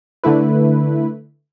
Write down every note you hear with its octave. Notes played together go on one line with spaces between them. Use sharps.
D3 A3 E4 B4